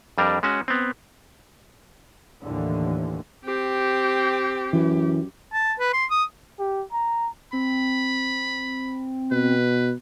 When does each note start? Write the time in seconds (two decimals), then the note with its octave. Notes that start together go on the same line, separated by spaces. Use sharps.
0.18 F2 G3 D4 A#4
0.43 G#3 C#4 F#4
0.68 B3 C4
2.43 D#2 A2 D3 E3
3.45 C4 G4
4.73 F#2 E3
5.53 A5
5.79 B4
5.93 C6
6.10 D#6
6.59 G4
6.92 A#5
7.53 C4 B5
9.31 B2 B4